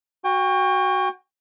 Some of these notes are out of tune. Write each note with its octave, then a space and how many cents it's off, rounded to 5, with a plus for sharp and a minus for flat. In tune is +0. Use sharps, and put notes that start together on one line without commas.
F#4 +0 G5 +35